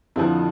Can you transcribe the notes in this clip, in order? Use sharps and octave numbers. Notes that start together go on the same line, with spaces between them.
F2 D3 F3 E4